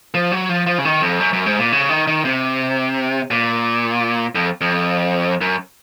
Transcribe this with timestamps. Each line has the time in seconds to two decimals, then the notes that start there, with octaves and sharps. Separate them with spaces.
0.14 F3
0.32 F#3
0.49 F3
0.66 F3
0.78 C#3
0.85 D#3
1.02 F2
1.20 F#2
1.33 F#2
1.46 G#2
1.59 A#2
1.72 C#3
1.90 D#3
2.07 D#3
2.25 C3
3.31 A#2
4.35 F2
4.61 F2
5.41 F#2